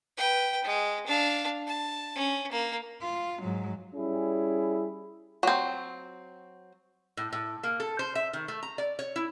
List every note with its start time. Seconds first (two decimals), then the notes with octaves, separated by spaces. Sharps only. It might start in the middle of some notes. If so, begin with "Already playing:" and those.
0.17 B4 G5
0.64 G#3
1.07 D4 F5
1.67 A5
2.15 C#4
2.52 A#3
3.02 F4
3.42 G#2 F#3
3.95 G3 C#4 E4 G#4
5.43 F#3 C4
7.17 A2
7.33 A2
7.63 A#3
7.80 A4
7.99 C5
8.15 E5
8.33 D#3
8.48 A3
8.63 A#5
8.78 D5
8.99 C#5
9.16 E4